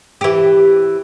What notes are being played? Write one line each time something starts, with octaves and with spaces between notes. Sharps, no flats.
E3 G4